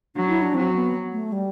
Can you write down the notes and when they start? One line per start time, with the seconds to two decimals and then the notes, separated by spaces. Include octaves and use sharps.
0.16 F#3 D4
0.28 E4
0.42 D4
0.55 F#3 C4
0.74 B3
1.12 A3
1.32 G3